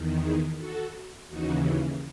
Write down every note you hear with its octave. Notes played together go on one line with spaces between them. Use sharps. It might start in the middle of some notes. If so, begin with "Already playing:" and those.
Already playing: E2 D#3
E4 G#4
F#4 A4
D#2 C#3 E3 D#4 F#4